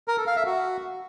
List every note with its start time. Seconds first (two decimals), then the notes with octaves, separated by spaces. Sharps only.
0.08 A#4
0.17 A4
0.27 F5
0.36 E5
0.46 F#4